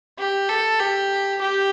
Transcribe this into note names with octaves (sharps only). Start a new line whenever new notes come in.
G4
A4
G4
G4